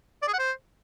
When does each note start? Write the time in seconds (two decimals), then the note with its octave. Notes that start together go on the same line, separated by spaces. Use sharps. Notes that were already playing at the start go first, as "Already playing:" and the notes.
0.22 D5
0.28 G#4
0.33 F#5
0.39 C5